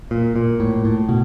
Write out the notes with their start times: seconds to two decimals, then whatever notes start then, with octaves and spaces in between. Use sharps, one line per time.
0.11 A#2
0.36 A#2
0.60 A2
0.85 A2
1.09 B2